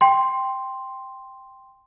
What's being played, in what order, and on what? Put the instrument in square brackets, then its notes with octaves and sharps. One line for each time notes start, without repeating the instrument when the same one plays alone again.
[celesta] G5 C6